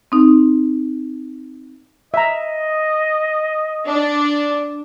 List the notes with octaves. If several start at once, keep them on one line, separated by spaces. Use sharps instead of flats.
C4 D#4
D#5 E5 A#5
D4